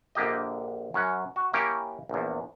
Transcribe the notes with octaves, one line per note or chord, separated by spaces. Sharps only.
A#1 D3 A#3 G4 D#5
F#2 C#4 F#5
F#4
A#3 C#4 E4 G4 A#4
A#1 E2